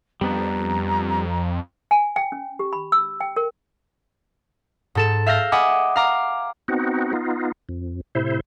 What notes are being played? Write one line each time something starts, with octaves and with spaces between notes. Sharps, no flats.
F2 G3 B3 D4 A#5
G#5
G5
C#4
G4
B5
E6
G5
A#4
G#2 A4 E7
E5 F5 G6 A#6
D#5 F#5 G#5 B5 D6
F5 A#5 D6
B3 C4 D#4 F#4
B3 D#4 F4
F2
A2 C3 E4 C5